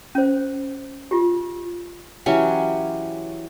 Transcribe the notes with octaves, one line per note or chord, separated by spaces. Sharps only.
C#4 C5
F4 G4
E3 F#3 C#4 G4